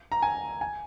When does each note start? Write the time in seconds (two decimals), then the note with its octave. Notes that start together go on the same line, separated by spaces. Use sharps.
0.12 A#5
0.22 G#5
0.61 G#5